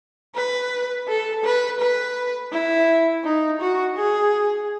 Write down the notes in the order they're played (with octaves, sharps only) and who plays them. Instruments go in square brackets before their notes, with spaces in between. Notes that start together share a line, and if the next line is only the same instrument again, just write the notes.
[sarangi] B4
A4
B4
B4
E4
D#4
F#4
G#4